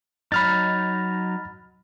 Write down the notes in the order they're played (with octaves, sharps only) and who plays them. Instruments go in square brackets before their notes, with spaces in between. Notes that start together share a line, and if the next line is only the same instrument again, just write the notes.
[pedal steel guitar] F#3 D#4 [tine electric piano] B5 F6 A6